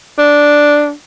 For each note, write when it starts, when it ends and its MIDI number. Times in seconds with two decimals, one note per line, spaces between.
0.18 0.91 62